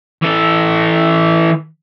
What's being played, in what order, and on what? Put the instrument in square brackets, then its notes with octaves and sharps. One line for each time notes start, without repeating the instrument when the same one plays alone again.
[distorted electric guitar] E3 A4